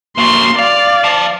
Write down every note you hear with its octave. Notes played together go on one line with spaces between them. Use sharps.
A#3 F#4 C6
D5 F5
F5 A5